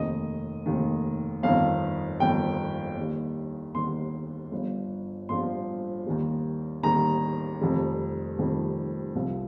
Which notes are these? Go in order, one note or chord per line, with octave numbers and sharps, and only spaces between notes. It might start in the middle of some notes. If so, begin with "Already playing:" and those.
Already playing: F1 D#2 D#3 D#5
F1 D#2 D#3
G1 F2 D#3 F5
G1 F2 D#3 G5
D#2 D#3 G3
D#2 D#3 G3 C6
G1 G2 F3
G1 G2 F3 C6
D#2 D#3 G3
D#2 D#3 G3 A#5
F1 F2 D#3 G3
F1 F2 D#3 G3
C2 C3 F3